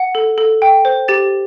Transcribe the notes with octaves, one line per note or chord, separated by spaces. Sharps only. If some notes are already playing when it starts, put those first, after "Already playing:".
Already playing: F#5
A4
A4
G5
C5
G4 A6